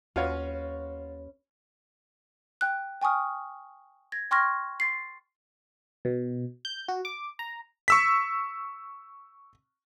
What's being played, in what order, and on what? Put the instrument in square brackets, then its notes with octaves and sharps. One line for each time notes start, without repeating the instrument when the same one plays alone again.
[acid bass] D#2 [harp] C#4 B4 [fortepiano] F4 F#4 C#5
[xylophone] G5 F#6
G5 G#5 C#6 D#6 F6
G#6 A#6
G5 C6 C#6 F6 G#6 A#6
C6 A6 C7
[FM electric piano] B2
G6
F#4
D6
A#5
[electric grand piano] C#6 E6 B6